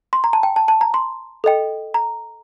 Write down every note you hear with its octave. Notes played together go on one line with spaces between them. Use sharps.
C6
A#5
A5
G5
A5
A5
A#5
C6
A4 D#5 G5
A#5